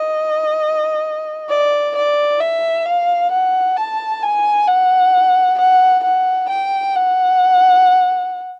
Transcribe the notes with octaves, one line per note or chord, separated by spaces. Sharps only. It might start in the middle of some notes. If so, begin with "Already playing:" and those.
Already playing: D#5
D5
D5
E5
F5
F#5
A5
G#5
F#5
F#5
F#5
G5
F#5